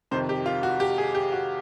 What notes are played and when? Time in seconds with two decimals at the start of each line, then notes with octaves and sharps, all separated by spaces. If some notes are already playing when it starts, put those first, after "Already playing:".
0.11 F2 C3 D#3 C5
0.29 G4
0.46 F4
0.63 F#4
0.80 G4
0.98 G#4
1.15 G4
1.32 F#4